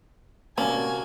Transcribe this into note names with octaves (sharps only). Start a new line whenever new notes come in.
C3 A#3 C#4 F#4 D5 G#5 A5